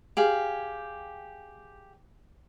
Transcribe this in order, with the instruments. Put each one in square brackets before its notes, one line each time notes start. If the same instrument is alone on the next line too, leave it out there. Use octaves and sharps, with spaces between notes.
[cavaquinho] G4 G#4 F5